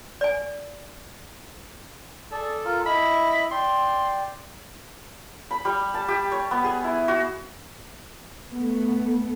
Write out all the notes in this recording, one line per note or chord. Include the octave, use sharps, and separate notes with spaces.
D5 G#5
G#4 A4 D5
F4 A#4
E4 D#5 E5 B5
D5 G5 C6
B5
G3
A5
G4
C#5
B3
G#4
E4
F#4
A3 B3